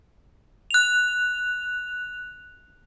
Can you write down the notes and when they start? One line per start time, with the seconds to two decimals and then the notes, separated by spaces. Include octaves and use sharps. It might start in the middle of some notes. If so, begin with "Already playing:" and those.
0.71 F#6 F7